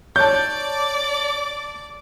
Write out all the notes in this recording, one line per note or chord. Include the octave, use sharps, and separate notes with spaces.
C#5 D5 A5 D6 G6